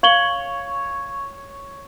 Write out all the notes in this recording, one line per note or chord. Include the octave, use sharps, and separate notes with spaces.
C#5 F5 F#7 G7